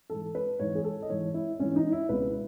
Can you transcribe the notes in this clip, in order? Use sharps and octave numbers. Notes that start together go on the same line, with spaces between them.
G#2 E3 A4
B4
G#2 E3 C#5
G#4
A4
D#5
G#2 E3 C#5
E4
G#2 E3 C#4
D#4
E4
C#2 B2 B4